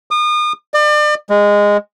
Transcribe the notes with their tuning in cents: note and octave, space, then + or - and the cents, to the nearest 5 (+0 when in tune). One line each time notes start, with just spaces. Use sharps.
D#6 -35
D5 +35
G#3 -15